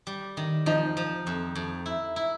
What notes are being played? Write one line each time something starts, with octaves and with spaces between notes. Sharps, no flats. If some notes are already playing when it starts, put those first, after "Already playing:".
G3
D#3
F3 D#4
F3
F2
F2
E4
E4